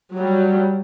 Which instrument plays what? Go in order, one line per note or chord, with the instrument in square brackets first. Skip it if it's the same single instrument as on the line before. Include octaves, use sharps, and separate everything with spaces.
[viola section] F#3 G3